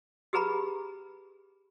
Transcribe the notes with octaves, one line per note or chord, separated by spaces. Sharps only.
G4 G#4 B4 A#5 B5